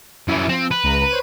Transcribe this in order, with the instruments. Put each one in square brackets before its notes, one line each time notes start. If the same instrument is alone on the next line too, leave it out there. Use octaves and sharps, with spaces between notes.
[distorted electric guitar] F#2 E3 [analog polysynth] E4
[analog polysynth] F3 [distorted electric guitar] C4
[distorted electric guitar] B4
[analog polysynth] C#2 A#5
C5 C#5 D#7